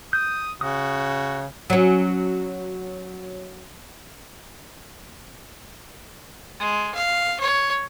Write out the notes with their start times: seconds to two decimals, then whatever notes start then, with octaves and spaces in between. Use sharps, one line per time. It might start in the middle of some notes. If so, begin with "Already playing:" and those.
0.13 D#6 G6
0.61 C#3 F#4 D#6
1.70 F#3 C#4
6.59 G#3
6.95 F5
7.40 C#5